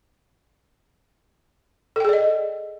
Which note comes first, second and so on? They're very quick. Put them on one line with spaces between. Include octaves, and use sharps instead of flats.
A4 G5 G#4 D5 D#5